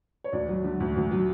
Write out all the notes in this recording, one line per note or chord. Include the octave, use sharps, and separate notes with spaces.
C#5
D2 D5
F#3
D3
D2
D2
F#3